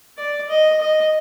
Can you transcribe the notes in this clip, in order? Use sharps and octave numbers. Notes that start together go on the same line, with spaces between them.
D5
D#5
D#5